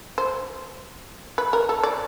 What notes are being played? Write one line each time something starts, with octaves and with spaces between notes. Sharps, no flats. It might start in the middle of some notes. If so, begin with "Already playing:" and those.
C5
B4
A#4
A4
D5